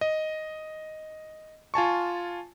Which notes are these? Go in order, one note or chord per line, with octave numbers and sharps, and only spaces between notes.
D#5
F4 G#5 A5 C#6